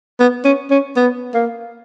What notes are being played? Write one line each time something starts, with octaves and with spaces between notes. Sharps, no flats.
B3
C#4
C#4
B3
A#3